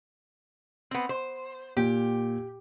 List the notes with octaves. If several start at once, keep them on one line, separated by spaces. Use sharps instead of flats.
B3 C4
C5
A#2 G4